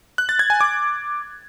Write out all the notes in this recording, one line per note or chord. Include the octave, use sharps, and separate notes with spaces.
F#6
A6
G#6
G#5
D6